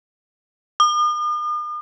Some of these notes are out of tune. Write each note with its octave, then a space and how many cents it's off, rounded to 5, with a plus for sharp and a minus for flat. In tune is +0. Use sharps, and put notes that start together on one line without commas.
D#6 -45